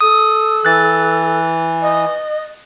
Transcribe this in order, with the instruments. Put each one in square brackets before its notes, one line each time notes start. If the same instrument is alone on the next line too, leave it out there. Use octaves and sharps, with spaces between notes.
[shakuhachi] A4 [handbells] D#6
[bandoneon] E3 [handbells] F#6 A6
[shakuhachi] D#5